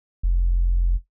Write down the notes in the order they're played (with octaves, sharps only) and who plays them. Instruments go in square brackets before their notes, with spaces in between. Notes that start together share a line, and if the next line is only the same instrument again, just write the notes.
[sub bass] F1